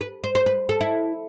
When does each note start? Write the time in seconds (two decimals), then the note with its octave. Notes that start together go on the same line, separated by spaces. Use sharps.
0.01 B4
0.24 C5
0.35 C5
0.46 B4
0.69 A4
0.81 E4